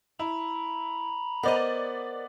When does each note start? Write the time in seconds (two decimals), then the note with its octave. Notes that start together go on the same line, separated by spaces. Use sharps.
0.19 E4 A#5 B5
1.43 B3 A#4 C5 D5 D#5